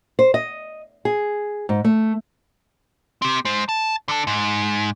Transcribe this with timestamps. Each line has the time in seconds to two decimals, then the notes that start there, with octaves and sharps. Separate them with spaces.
0.19 C5
0.34 D#5
1.05 G#4
1.69 G#2
1.84 A3
3.22 C4 G4
3.45 G#3 C5
3.69 A5
4.09 D3 A4
4.27 G#2